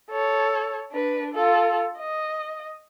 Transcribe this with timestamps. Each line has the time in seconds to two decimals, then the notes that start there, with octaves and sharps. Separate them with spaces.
0.10 A4 C#5
0.91 D4 B4
1.34 F4 A4
1.98 D#5